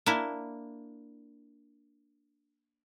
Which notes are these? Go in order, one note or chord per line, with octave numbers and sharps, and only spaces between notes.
A#3 D4 E4